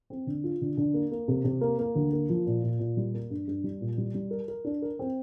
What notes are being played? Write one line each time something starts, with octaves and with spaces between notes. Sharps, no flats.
C4
D3
F4
D3
D3
A#3
A#3
C3
C3
A#3
A#3
D2
A#3
F3
A#2
A#2
A#2
G3
A#3
G2
G2
G3
A#2
G3
G3
A#4
A#4
D4
A#4
C4